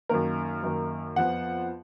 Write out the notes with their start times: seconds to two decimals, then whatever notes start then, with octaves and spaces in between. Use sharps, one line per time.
0.09 F#2 D#3 A#3 A#4
0.63 F#2 D#3 A#3
1.16 F2 F3 B3 F#5